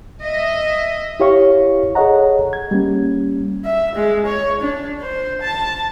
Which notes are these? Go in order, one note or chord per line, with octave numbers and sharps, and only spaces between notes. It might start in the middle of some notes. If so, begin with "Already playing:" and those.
D#5 E5
E4 G4 C#5 F5 C#6
G#4 A4 C#5 D#5 F#5 A#5
G#6
G3 A#3 C#4
E5
G#3
C#5
D4
C5
A5